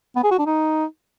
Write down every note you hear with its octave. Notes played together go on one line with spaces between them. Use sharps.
B3
G#4
F#4
D4
D#4